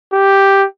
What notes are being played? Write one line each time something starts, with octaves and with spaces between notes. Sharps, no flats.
G4